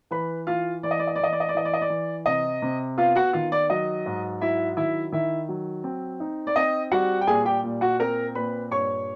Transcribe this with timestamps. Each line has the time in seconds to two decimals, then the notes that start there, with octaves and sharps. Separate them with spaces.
0.11 E3 B4 B5
0.47 E3 F4 F5
0.83 E3 D5
0.91 D#5
0.99 D5
1.07 D#5
1.15 D5
1.19 E3 D#5
1.33 D5
1.40 D#5
1.49 D5
1.54 E3 D#5
1.65 D5
1.74 D#5
1.81 D5
1.90 E3
2.26 C3 D#5
2.62 C3
2.97 B3 F4 F5
3.15 F#4 F#5
3.33 D#3 F4 F5
3.52 D5
3.70 F#3 D#5
4.06 G#2
4.41 F#3 E4 E5
4.77 D#3 E4 E5
5.12 D#3 E4 E5
5.49 F#3
5.84 C4
6.20 D#4
6.47 D5
6.56 C4 D#5
6.91 G3 F#4 F#5
7.21 G5
7.27 A#2 G#4 G#5
7.45 G4 G5
7.63 A#2
7.81 F#4 F#5
8.00 C4 A#4 A#5
8.35 A#2 B4 B5
8.71 G2 C#5 C#6